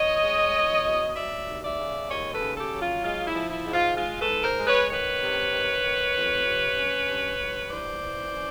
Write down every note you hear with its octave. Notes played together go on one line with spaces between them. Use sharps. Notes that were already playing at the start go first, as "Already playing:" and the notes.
Already playing: E2 C#5 D#5
G#3
E2
B2
F#3 D5 E5
D#2
D5 E5
C#3
D#2 C#5 D#5
A4 B4
C#3
G4 A4
F#3
F4
G#3 F4
E4
F3
E4
G#2
F4
G#3 F4
A4 B4
G#2
A#4 C5
G#3
B4 C#5
D#3 B4 C#5
C3
D#3
D#3
F2
C3
C#4
G2
G2
E3 C5 D5
E3
C#4